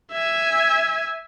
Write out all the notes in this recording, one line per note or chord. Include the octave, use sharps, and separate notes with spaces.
E5 G#5